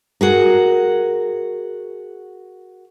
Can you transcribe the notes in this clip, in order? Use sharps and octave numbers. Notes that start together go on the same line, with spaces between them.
F#4 G#4 A#4